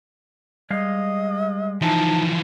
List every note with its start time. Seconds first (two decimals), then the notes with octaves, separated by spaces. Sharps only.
0.70 G3 G#3 D#5 F5
1.82 E3 F3 D#4 A5